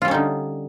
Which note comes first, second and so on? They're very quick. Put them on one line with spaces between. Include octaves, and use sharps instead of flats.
F4 G3 C#4 D#4 D3